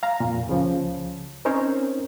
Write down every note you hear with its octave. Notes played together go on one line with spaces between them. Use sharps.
F5 A#5
F2 A#2
C#2 C#3 F3
C4 C#4 D#4 A#4 C5 C#5